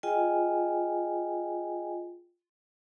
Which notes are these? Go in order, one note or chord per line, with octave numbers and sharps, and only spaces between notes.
F4 G#4 D#5 G5 G#5